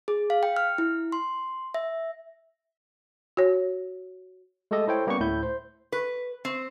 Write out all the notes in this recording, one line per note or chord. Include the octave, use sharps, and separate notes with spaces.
G#4
F5
G5
F6
E4
C6
E5
F#4 C#5
G#3 A3 G4 A4 D#5
E4 A4 C5 C#5 G5
G3 A#3 B3 C#4 F5 C#6
D2 A2 E4 G6
C5
B4
C4